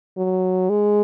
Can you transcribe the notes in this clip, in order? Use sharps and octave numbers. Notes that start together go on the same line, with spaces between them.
F#3
G#3